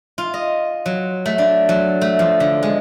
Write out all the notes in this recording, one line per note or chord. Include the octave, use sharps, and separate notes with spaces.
F4
D#5
F#3
A3
D4
F#3
A3
F3
D3
G#3